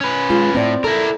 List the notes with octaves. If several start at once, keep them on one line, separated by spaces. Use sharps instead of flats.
C#4 B4
G#3 F4
A2 C4 D5
E4 A4 A#4